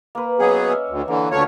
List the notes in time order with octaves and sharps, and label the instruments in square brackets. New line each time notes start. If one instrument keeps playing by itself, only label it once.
[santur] A#3 B4
[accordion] F#3 B3 G#4 [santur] C#4 D#5 F#5
[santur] C#4 E5
[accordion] D2
[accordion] D3 E3 [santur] A#3
[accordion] D2 A3 C#5 [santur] F#3 F4